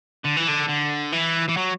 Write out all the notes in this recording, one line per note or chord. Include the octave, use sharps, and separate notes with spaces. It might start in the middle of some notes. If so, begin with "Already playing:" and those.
D3
E3
D3
D3
E3
E3
F#3